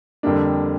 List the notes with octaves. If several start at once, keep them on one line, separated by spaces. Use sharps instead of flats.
F2 D3 G3 A#3 D4